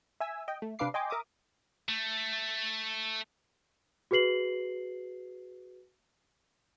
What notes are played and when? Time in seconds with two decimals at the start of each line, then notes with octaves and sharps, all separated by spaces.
0.20 E5 G#5 E6
0.48 D#5 G5
0.62 A3
0.79 C3 D4 B4 F5 D6 C7
0.94 D#5 G5 G#5 C6 D6
1.10 A#4 E5 D6 D#6
1.89 A3
4.11 F#4 G#4 B4 C7 F#7